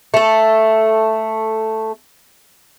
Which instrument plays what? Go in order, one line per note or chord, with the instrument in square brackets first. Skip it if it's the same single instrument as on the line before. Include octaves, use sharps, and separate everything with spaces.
[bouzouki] A3 A4